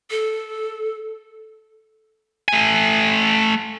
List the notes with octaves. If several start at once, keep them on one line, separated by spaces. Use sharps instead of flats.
A4
A3 G#5